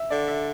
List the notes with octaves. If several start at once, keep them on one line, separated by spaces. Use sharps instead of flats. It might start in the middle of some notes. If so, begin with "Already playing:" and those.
Already playing: E5
D3 D5
E5